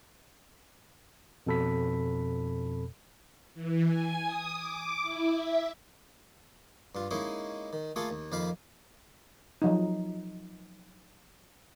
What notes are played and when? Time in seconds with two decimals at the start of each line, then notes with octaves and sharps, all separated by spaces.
1.47 F2 B2 A4 B5 B6
3.54 E3
3.85 G#5
4.22 D#6
4.56 D6
5.02 E4
5.33 E5
6.95 G2 F4
7.11 G#3 A#3 C#4 D#4 E4
7.73 D#3
7.96 A3 A#3 F4 G#4 A4
8.10 D#2
8.32 F2 D#3 A#3 F5 A#5 B5
9.62 F3 F#3 D#4